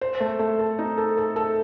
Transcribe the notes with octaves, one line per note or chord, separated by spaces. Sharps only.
C5
A3
A3
A4
D#4
A4
A4
A4